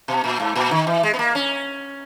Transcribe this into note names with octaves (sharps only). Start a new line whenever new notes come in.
B2
A#2
G#2
A#2
D#3
E3
G#3
B3
A#3
C#4